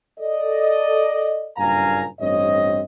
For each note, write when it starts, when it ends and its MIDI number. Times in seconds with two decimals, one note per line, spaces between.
0.19 1.50 69
0.19 1.50 74
0.19 1.50 75
1.57 2.06 30
1.57 2.06 43
1.57 2.06 46
1.57 2.06 77
1.57 2.06 80
1.57 2.06 82
2.20 2.81 33
2.20 2.81 43
2.20 2.81 60
2.20 2.81 73
2.20 2.81 75